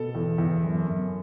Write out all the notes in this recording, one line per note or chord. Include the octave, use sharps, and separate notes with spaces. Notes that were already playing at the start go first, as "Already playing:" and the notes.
Already playing: B2 A4
E2
E2
F#2
F#2